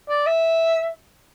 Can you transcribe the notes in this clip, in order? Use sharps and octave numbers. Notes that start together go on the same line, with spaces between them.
D5
E5